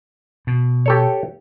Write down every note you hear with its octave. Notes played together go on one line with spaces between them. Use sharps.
B2
G4 A4 C#5